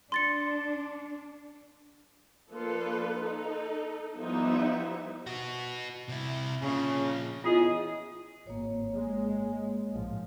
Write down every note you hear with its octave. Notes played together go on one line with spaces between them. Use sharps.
D4 C6 A6 C#7
F3 A#3 D4 F4 A4 B4
D#4 A4
F3 G3 B3 D#4 E4 E5
B3 F#4
C3 E4
A#2 C#3 F3
E2 F4 G#4 D#5
G#1 G#2 A#3 C#5
G#3
A#1 G#2 F3